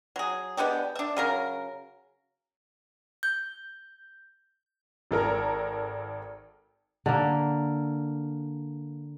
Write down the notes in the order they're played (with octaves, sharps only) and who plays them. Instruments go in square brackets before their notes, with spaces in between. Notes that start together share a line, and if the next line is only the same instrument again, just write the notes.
[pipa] F#3 G#4
G#3 B3 D4 G4
D4 E5
C#3 F#3 A#4
[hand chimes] G6
[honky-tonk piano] G#1 A4 A#4 A#5
[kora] D3 A#3